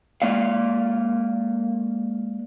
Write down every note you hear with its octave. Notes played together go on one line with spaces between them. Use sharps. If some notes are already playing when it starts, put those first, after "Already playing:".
G#3 A#3 D5 F5